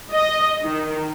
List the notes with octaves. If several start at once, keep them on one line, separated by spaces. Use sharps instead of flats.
D#5
D#3